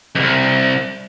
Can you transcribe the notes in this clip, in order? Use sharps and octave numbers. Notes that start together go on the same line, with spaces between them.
C2 F2